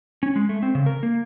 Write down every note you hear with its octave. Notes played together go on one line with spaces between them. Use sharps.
C#4
G#3
A3
C4
C#3
A#4
A#3